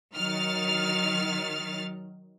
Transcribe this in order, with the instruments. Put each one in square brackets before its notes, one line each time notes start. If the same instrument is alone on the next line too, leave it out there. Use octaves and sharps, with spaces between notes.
[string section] D#3 F#3 F6 A6